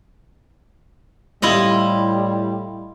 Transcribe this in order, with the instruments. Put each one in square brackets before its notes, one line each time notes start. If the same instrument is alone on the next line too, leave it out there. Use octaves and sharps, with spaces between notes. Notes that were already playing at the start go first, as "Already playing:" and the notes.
[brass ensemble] A2 G3 [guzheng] E4 F4 D#5